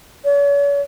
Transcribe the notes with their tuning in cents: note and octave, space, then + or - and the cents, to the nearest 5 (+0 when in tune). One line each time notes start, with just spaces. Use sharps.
C#5 +40